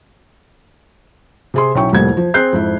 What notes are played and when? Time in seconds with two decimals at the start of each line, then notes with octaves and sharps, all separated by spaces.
1.54 C3 G#4 C6
1.75 B1 C#4 E4 G5 C#6
1.93 C2 F2 A2 G3 A#3 G#6
2.17 F3
2.34 C4 G#4 F#6 G6 C7
2.53 F2 G#2 E4